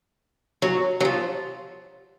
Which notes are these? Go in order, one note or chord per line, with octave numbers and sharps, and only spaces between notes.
F#3
F#3
F3